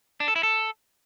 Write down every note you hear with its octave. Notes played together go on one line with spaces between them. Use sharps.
D4
A4
E4
A4